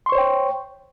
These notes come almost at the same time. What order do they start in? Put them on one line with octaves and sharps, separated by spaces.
C6 C#6 C5 C#5 G5